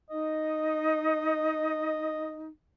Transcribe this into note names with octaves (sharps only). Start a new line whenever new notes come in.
D#4 D#5